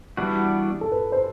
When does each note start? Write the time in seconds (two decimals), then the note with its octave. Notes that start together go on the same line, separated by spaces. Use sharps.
0.17 E3 G3 B3 D4 F#4
0.81 A4
0.92 B4
1.12 C5